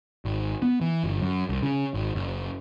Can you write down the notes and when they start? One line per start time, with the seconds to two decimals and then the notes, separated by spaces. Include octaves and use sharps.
0.25 G#1
0.62 B3
0.81 E3
1.04 G1
1.22 F#2
1.49 C2
1.63 C#3
1.94 G#1
2.15 F#1